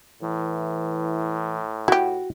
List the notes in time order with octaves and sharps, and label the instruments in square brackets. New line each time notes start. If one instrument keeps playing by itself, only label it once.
[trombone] A2 [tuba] E3
[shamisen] E4 G4 [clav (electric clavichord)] F#4